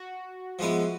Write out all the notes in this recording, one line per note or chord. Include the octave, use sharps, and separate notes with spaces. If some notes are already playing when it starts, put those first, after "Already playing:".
Already playing: F#4
F3 G#3 B3 E4